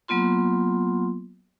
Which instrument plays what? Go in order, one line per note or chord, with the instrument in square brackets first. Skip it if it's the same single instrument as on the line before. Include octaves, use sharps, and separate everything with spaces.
[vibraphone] F#3 A#3 B3 F4 C6